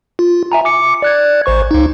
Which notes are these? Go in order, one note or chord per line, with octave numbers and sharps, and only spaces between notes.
F4
E5 G#5 A#5
D6 C#7
D5 F#6 G#6
A1 C5 C#6
C#2 D#4